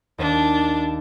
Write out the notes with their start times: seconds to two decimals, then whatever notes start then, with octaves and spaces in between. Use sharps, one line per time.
0.18 D#2 D4